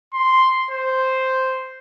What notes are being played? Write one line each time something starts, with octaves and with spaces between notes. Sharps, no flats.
C6
C5